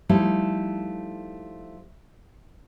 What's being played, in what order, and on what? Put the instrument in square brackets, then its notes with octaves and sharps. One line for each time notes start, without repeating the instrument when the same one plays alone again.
[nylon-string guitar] F3 G3 A3 D#4 E4